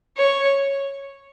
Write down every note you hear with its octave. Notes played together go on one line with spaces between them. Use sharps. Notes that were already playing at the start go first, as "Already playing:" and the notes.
C#5